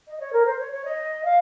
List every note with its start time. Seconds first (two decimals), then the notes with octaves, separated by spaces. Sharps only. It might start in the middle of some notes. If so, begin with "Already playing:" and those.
0.08 D#5
0.20 C#5
0.33 A#4
0.46 C5
0.60 C#5
0.72 C#5
0.85 D#5
1.25 F5